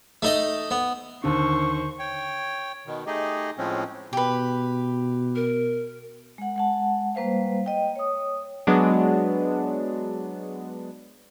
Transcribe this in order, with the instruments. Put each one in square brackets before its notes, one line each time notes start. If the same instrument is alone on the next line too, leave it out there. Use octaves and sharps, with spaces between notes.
[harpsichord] A3 D#4 D#5
B3
[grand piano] D#2 D3 [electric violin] C5 C#6
[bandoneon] C#5 G5
B2 D#3
A3 D#4 G4 G#4 D#5
A2 F3 G#3 C4 C#4
[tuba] B2 [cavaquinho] G4 B4
[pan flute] A#4
[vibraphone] G#3 F#5
G#3 F#5 A5
G3 A#3 B4 C5 F5
D#5 G5
C#5 D#6
[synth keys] F#3 G#3 B3 D4